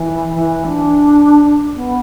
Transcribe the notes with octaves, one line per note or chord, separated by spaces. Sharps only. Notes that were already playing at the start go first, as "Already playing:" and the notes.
Already playing: E3
E3
D4
B3